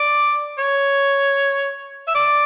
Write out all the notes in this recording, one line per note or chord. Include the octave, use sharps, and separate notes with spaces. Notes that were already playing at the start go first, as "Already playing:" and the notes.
Already playing: D5
C#5
E5
D5